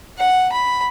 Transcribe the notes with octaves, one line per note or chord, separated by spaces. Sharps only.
F#5
B5